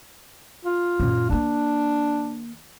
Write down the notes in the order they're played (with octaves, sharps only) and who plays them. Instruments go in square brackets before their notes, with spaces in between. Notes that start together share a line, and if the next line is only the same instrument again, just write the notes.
[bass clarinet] F4
[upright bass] F#2 A#2
[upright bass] D#3 A#3 [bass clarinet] D4